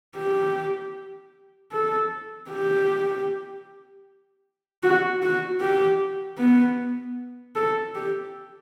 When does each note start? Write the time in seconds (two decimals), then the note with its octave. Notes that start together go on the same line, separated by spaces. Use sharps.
0.16 G4
1.72 A4
2.50 G4
4.83 F#4
5.22 F#4
5.61 G4
6.38 B3
7.56 A4
7.95 G4